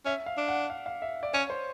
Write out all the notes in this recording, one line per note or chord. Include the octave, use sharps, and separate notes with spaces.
C#4 E5
F5
D4
F#5
F5
F5
E5
D5
C#4 C#5
C5